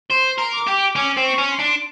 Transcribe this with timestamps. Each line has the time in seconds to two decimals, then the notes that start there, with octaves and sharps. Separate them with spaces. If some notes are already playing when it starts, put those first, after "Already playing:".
0.10 C5 C6
0.38 A#4
0.53 D6
0.67 G4
0.95 C#4 D6
1.17 C4
1.24 C#6
1.38 C#4
1.51 C6
1.59 D4